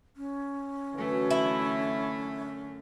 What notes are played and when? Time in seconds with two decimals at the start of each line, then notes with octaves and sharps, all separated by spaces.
0.16 C#4
0.94 F#2 D3 E3 A3
1.30 E4